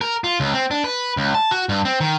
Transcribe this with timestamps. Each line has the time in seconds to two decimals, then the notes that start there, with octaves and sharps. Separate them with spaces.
0.01 A#4
0.24 F4
0.40 C#2
0.54 C4
0.71 D4
0.84 B4
1.17 C#2
1.35 A5
1.51 F#4
1.69 G2
1.85 C4
2.01 D#3